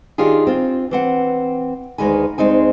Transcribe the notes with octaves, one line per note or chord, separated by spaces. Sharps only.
D#3 D4 F4 G4 G#4
C4 F4
E3 C4 F#5
D2 D#3 G#3 B4 G#5
D2 G#3 C4 D#4 G#5